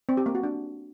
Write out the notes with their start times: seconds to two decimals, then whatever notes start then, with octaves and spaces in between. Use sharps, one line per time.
0.09 C4
0.17 G4
0.26 A#3
0.35 F#4
0.43 D4